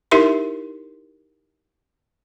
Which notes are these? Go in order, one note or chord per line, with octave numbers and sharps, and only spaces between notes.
D#4 E4 G4 A#4 E5 C6